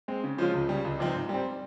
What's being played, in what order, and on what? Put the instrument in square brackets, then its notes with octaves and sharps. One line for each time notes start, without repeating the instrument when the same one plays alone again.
[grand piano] G#3 C4
C#3
F3 G#3 C#4 F4
C#2
C#3 G3
C#2
C3 F3 C4 D#4
G#2
G3 C4